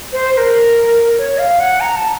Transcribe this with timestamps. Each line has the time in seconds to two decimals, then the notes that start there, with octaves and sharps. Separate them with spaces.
0.13 C5
0.33 C5
0.37 A#4
1.18 C#5
1.38 F5
1.60 F#5
1.81 A#5
1.96 A5